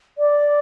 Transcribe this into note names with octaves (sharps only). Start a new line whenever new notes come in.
D5